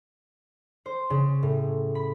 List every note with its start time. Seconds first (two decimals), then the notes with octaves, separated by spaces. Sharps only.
0.86 C5
1.10 C#3
1.43 A2
1.95 B5